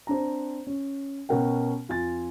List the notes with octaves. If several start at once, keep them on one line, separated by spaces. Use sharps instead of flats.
C4 D4 A#5
C#4
B2 C#4 A#4 F#5 G5
F2 F4 G#5 A6